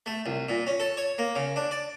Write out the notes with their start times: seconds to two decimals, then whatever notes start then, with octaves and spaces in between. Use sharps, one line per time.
0.06 A3
0.26 C2
0.49 A#2
0.67 C#4
0.80 A4
0.97 C#5
1.18 A#3
1.36 C#3
1.56 D4
1.71 D5